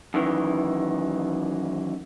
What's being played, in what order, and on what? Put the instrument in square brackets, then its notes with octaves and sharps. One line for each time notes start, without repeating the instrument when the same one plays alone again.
[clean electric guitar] F#2 D#3 E3